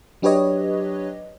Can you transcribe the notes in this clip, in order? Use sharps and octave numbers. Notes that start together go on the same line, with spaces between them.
F#3 D4 G4 B4 C#5 D#5